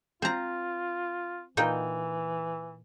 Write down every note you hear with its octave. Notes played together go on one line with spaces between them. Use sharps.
C4 F4 A#5
A#2 E3 D#4 G5